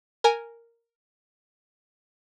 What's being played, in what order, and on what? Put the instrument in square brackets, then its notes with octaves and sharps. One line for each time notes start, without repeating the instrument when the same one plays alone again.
[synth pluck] A#4 G#5